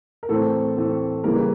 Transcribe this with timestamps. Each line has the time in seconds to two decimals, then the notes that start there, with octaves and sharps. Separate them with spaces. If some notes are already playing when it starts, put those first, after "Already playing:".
0.23 A#4
0.29 A2 E3 A3 C4 A4
0.77 A2 E3 A3 C4
1.24 C#3 E3 G3 A#3 A#4
1.35 B4